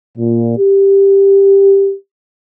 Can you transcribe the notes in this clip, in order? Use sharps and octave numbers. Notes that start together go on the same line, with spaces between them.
A#2
G4